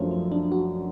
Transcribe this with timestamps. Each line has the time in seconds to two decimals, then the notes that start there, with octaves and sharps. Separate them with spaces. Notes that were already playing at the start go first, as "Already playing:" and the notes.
Already playing: F#2 F3 A3 C#4 D4
0.11 C#4
0.32 D4
0.52 F#4